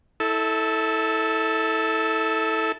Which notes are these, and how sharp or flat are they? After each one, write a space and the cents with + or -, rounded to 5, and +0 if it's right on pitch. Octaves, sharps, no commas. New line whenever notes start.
E4 -25 A4 +0